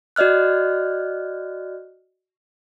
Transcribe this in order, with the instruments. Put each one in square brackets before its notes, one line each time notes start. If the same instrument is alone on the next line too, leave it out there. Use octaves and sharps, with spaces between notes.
[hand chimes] F#4 D5 D#5 F6 F#6